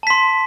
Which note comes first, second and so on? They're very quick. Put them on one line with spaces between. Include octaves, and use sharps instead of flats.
A5 B6 C6